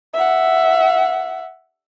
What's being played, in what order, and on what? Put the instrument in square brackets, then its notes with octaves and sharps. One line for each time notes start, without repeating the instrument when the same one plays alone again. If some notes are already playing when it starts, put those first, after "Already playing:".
[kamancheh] E5 F#5